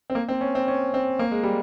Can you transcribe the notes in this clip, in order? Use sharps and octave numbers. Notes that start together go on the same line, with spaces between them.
C4
A#3
C4
C#4
C4
C#4
C4
A#3
G#3
G3